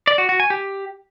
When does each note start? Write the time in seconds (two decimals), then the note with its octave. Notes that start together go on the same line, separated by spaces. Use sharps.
0.07 D5
0.18 F#4
0.29 F#4
0.40 G#5
0.50 G4